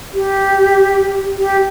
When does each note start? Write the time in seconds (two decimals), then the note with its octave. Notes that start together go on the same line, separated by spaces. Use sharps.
0.14 G4
1.38 G4